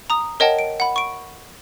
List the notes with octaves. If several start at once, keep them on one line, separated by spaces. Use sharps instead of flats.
A#5 D#6
A#4 C#5 D#5 F#5 G5 A5
D7
F#5 B5
C#6 D7